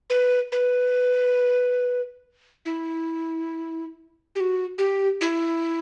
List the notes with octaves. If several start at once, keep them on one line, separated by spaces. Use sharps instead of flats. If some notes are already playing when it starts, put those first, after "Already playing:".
B4
B4
E4
G4
F#4
G4
E4